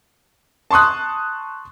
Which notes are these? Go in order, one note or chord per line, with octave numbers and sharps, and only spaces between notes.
A5 C6 C#6 D#6 F#6